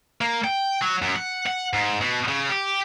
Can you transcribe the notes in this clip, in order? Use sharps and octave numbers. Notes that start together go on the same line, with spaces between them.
A#3
G5
F#3
F#2
F#5
F#5
G#2
B2
C#3
G4